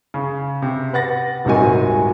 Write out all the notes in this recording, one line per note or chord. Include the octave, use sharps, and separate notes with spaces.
C#3
C3
B4 F#5 A6 A#6
D#1 G#2 C3 D#3 F#4 G#5